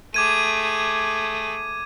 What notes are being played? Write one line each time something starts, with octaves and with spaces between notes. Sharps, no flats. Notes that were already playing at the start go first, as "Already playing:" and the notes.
A3 G#4 D6 G#6 D#7